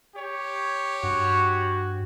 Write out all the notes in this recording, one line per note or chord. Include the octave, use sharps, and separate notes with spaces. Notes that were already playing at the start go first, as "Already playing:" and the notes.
G4 C#5
G2 F#4